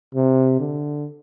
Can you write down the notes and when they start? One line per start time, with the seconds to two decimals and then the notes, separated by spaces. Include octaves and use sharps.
0.15 C3
0.60 D3